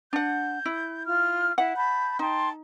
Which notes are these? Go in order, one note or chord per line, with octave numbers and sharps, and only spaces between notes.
D4 F#5 G6
E4
F4 F6
E4 F#5
A5 B5 G6
D#4 G5 A5 C6